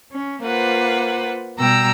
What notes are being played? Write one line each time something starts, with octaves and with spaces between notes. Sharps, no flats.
C#4
A#3 F4 B4 C5 F#5
B2 G3 B3 G5 A#5 E6